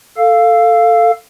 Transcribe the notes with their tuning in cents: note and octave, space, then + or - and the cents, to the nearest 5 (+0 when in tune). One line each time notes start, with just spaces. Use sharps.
A4 +10 F5 +0